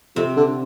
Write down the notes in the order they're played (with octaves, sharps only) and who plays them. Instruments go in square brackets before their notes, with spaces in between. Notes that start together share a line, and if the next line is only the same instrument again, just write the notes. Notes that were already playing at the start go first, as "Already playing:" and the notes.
[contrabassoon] F2 [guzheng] C3 C4
[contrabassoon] D3